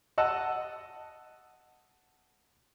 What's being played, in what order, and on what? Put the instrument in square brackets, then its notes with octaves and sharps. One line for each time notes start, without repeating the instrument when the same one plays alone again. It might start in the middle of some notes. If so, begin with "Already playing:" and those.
[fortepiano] D#5 F#5 A5 E6